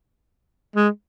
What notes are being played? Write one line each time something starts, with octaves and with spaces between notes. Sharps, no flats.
G#3